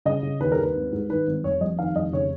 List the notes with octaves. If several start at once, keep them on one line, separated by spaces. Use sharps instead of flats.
C#3 D#5
C#3
D#2 B4
A#4
D#2
B4
G#1
G#2
D#3 B4
G#1
F1 C#5
F2 D#5
D#3 F5
F1 D#5
C#3 C#5